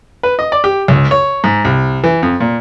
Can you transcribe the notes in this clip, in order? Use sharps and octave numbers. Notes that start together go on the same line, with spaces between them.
B4
D#5
D5
G4
C#2
C#5
G#2
C2
E3
F2
A#2